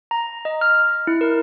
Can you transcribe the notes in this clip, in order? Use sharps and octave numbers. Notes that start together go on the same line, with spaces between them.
A#5
D#5
F6
E4
A#4